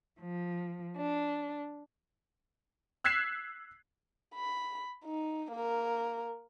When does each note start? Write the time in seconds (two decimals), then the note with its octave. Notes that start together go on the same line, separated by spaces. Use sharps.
0.20 F3
0.97 D4
3.04 E6 F#6 G#6 B6 C7 E7
4.35 B5
5.05 D#4
5.52 A#3 A#4